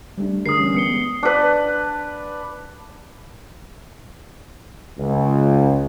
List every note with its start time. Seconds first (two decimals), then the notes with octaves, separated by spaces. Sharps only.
0.18 G3 A3 D4
0.46 D3 G#4 A#4 D#6 C7
0.58 E3 G3 C#4
0.75 B3 D#6 C#7 G7
0.90 G#3
1.23 D4 B4
4.98 C#2